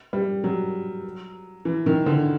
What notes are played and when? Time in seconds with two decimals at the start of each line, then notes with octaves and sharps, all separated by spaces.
0.13 G3
0.44 F#3
1.65 E3
1.86 D#3
2.06 D3